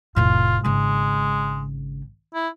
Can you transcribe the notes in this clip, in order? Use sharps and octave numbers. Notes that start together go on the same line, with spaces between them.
F1 A2 F4
G#1 C#3 G#3
E4